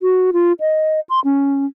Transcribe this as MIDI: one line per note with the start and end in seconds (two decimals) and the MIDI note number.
0.02 0.31 66
0.33 0.52 65
0.60 1.00 75
1.09 1.20 84
1.25 1.66 61